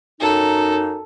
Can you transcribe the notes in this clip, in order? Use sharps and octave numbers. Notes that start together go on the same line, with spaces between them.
F#2 D#4 A4